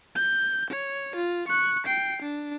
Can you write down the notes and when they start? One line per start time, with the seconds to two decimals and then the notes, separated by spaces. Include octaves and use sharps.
0.16 G6
0.70 C#5
1.16 F4
1.48 C#6 F#6
1.86 G5 C7
2.22 D4